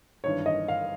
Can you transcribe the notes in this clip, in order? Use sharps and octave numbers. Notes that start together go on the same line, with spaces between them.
G#1 G2 E3 C#5
D#5
F5